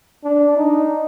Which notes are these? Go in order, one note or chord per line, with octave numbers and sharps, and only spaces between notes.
D4
D#4